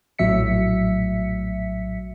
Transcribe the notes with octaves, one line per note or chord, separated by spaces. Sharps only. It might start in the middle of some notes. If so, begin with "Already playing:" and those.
A#1 A2 F#3 E5 B6 C#7